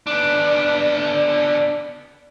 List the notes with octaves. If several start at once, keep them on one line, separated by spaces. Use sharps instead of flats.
B3 D4